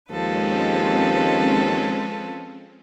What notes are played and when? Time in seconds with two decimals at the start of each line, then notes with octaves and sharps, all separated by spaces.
0.11 D#2 F3 G#3 C4 C#4 A4 B4